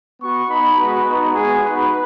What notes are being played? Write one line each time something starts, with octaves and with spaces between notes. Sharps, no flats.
B3 F#4 C#6
B3 D#4 F#4 B5
G#3 B3 F#4 B4
B3 D#4 F#4 B4
G#3 B3 F#4 G#4
B3 D#4 F#4 B4